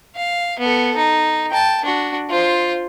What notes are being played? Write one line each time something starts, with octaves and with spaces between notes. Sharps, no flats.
F5
B3 A4
D#4
G5 A5
D4 F#4
F4 C5